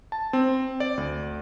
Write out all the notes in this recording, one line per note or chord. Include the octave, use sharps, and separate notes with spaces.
A5
C4
D5
D2